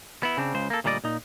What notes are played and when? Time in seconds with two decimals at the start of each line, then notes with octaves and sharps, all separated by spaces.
0.23 B3 E4
0.37 C#3 C4 D4
0.54 C#2 C#3 C5
0.70 A#3 A4
0.84 D2 A#2 G3 D4 D5 D#5
1.04 A#2 D#4